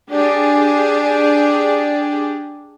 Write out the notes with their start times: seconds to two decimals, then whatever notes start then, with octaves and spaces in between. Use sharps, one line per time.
0.11 D4 G4 G#4 D5